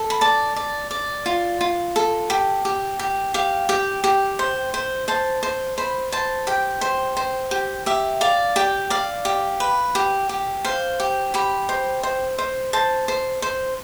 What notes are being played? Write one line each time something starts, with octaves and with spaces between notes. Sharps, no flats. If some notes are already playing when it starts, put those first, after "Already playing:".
Already playing: A4
B5
D5 A5
D5
D5
F4
F4
A4
G4
G4
G4
G4 F5
G4 G5
G4
C5
C5
C5 A5
C5
C5 B5
C5 A5
G4 G5
C5
C5
G4
G4 E5
D5 F5
G4 G5
D5 F5
G4
B4
G4
G4
C5 F5
G4
G4 B5
C5
C5
C5
C5 A5
C5
C5